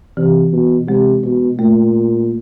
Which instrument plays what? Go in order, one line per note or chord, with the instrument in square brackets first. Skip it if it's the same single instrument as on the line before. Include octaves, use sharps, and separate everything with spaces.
[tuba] C3 [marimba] E3
[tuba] B2
[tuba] C3 [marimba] G#3
[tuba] B2
[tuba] A#2 [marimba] A3